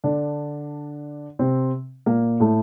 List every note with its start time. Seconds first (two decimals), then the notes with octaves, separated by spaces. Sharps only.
0.04 D3 D4
1.39 C3 C4
2.06 A#2 A#3
2.40 A2 A3